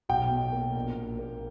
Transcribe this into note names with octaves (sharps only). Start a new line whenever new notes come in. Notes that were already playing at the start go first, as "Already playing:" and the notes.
B1 G5
B2
A#3
A#1
A#2
A#3